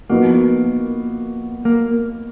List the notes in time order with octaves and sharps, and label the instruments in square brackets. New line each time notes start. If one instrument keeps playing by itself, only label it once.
[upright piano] F3 B3 D#4 F#4 [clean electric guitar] A#3
[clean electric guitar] A#3